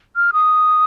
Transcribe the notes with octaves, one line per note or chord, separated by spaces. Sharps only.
F6
D#6